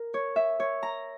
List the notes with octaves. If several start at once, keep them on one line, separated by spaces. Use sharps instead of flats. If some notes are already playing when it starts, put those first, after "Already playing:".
Already playing: A#4
C#5
E5
C#5
A#5